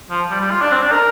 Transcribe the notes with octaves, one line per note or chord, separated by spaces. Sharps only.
F3
G3
G3
F4
D4
C4
D4
A#4